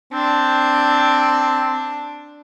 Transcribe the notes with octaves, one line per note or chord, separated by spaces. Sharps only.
C4 D4